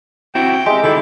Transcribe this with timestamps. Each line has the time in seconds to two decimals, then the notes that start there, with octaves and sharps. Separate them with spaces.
0.35 C4 E4 F#4 G5
0.66 G#3 G4 E5 A#5
0.83 C2 D#3 D#4 E4 A4